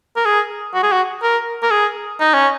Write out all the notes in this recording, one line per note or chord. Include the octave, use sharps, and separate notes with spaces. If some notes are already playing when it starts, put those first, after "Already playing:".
A#4
G#4
F#4
G#4
F#4
A#4
A#4
G#4
D#4
C#4